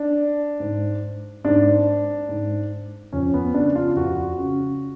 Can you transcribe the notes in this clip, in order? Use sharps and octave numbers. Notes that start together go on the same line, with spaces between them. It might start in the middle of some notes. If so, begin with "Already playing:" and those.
Already playing: D4
G#2
G#2 D4
G#2
F2 C#4
B3
C#3 D4
F4
F2 F#4
C#3